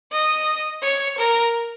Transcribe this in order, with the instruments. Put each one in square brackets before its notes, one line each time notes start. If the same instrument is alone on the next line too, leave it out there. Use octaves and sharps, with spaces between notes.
[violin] D#5
C#5
A#4